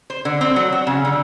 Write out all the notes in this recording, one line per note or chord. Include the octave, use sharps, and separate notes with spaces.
C5
D3
C4
F#3
F#4
C#3
D3